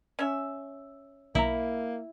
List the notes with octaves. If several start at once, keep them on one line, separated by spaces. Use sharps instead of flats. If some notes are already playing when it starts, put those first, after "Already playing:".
C#4 E5
B1 A#3 E4 A#5